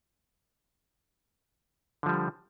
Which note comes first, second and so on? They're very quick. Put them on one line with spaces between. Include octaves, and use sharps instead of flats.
D3 F3 G3